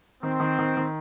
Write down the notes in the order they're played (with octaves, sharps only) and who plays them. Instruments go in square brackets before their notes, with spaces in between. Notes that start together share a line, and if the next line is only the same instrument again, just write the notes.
[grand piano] D#3 [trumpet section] C4
[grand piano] D#3
D#3
D#3